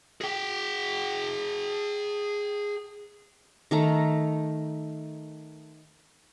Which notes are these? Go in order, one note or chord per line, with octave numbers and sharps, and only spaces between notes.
G#4 G5
D#3 A3 A#5